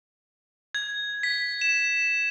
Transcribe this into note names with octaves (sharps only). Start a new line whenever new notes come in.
G#6
B6
E7